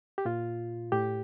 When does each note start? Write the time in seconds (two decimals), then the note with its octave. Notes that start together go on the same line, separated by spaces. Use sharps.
0.18 G4
0.25 A#2 F4
0.92 A2 G4